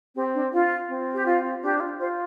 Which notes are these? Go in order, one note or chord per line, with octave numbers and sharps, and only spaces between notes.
C4 G4
D4
F4
C4
G4
F4
D4 G4
F4
F4 C5